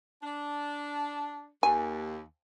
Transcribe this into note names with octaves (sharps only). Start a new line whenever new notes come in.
D4
D#2 G#5